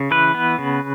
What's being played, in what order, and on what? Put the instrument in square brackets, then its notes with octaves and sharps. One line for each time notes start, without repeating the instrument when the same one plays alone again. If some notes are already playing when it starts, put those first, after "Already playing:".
Already playing: [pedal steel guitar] C#3
E3 B4
B3
C#3